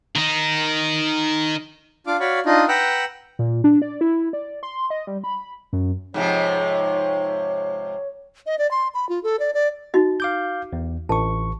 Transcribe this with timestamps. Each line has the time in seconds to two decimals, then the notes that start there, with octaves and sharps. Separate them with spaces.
0.16 D#3 D#4
2.07 D4 F4 F5 D6
2.20 F#4 C#5 D5 F5 B5 C#6
2.46 D4 D#4 F4 D#5
2.68 B4 F#5 G5 A#5 E6 F#6
3.39 A#2
3.64 D4
3.82 D5
4.01 E4
4.33 D5
4.63 C6
4.90 D#5
5.07 G3
5.24 B5
5.73 F#2
6.14 G#2 C3 F3 C#5
8.46 D#5
8.58 D5
8.71 C6
8.94 B5
9.09 F4
9.23 A4
9.39 D5
9.54 D5
9.94 D#4 F#4 D#5
10.20 F5 D6 G6
10.73 E2
11.09 A1 A5 C#6